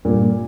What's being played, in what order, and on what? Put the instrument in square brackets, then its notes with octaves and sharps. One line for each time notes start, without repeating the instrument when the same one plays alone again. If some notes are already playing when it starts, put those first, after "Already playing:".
[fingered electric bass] G2 [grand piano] A#2